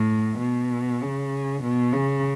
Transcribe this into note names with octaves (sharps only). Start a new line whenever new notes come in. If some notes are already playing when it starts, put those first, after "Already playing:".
Already playing: A2
B2
C#3
B2
C#3